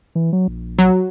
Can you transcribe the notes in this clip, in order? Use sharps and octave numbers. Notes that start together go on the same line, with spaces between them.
E3
F#3
A#1
F#3